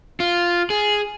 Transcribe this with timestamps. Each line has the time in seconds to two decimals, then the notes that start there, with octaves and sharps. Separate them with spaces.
0.20 F4
0.70 G#4